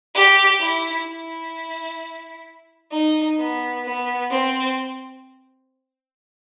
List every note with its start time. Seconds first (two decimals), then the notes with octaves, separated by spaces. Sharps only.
0.15 G4
0.61 E4
1.07 E4
2.92 D#4
3.39 B3
3.85 B3
4.31 C4